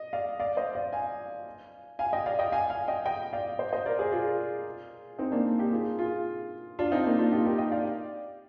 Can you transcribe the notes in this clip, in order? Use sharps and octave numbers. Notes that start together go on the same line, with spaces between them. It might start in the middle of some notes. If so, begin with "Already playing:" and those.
Already playing: D#5
D5 F5
D5 F5
C5 D#5
D5 F5
F5 G#5
F5 G#5
D#5 G5
D5 F5
D#5 G5
F5 G#5
F5 G#5
D#5 G5
D#5 G5
D5 F5
C5 D#5
C5 D#5
A#4 D5
G#4 C5
F4 G#4
C4 D#4
A#3 D4
D#4 G4
F4 G#4
F4 G#4
D4 F4
C4 D#4
A#3 D4
D4 F4
D#4 G4
G4 A#4
D#5 G5
D5 F5